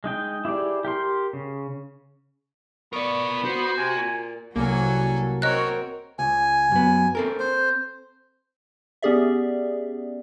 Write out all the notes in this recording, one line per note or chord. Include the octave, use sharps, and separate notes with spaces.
G#3 D#4 G5
E4 G4 G#4 D5
G4 A#4 C6
C#3
B3 A#4 D5 C#6
F#4 C5
C3 G#5
A#2
C2 F#3 A#3 F#4 A4 G#5
C4 F#4 A#4 C#5 D#5 F#6
C#2 G#5
F#2 B3
C4 A4 A#4
C5
B3 C#4 G4 G#4 D5 E5